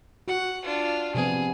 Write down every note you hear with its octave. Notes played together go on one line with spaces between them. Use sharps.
F#4 F#5
D4 F4
C3 F3 B3 G#4